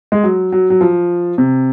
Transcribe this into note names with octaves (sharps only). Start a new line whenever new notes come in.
G#3
F#3
F#3
F#3
F3
C3